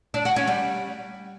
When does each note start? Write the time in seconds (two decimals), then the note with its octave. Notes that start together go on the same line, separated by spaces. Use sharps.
0.14 D4
0.25 F#4
0.36 C#4
0.47 G3